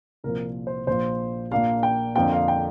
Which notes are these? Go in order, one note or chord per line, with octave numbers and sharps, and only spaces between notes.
C2 A#2 F3 A#4
C5
A#1 A#2 F3 C5
A#1 A#2 A#3 D4 F4 F5
G5
F2 D3 F3 A#3 F4 G5
F5
G5